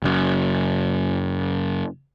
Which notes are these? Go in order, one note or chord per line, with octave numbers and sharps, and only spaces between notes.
F#1 F#2